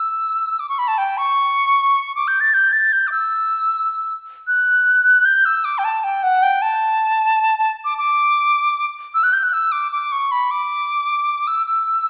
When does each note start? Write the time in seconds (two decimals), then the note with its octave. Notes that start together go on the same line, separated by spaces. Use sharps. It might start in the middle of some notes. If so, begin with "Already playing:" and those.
Already playing: E6
0.59 D6
0.69 C#6
0.78 B5
0.88 A5
0.98 G5
1.17 C#6
2.15 D6
2.27 G6
2.40 A6
2.54 G6
2.72 A6
2.92 G6
3.07 D6
3.12 E6
4.47 F#6
5.25 G6
5.45 E6
5.65 D6
5.78 G5
5.84 A5
6.04 G5
6.23 F#5
6.42 G5
6.62 A5
7.58 A5
7.84 D6
7.98 D6
9.14 E6
9.23 F#6
9.33 G6
9.43 F#6
9.53 E6
9.72 D6
9.91 D6
10.12 C#6
10.31 B5
10.50 D6
11.47 E6
11.66 E6